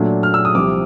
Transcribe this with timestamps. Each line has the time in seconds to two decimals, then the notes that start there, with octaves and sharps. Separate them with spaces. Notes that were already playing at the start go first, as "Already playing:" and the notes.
Already playing: A#2 F#3 A3 D4
0.23 F6
0.34 E6
0.45 D#6
0.55 C2 C3 F3 D6